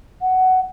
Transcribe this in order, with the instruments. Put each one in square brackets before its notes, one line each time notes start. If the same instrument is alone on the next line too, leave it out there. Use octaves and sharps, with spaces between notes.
[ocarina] F#5